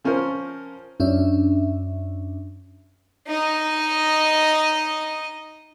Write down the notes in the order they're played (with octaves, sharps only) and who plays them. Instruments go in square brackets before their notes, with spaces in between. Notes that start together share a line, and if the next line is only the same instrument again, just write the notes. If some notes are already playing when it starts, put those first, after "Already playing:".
[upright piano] F3 C#4 A#4 C5
[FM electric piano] F#2 C#4 D4 E5
[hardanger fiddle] D#4 D#5